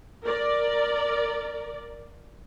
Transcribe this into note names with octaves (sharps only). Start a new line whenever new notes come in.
A#4 D5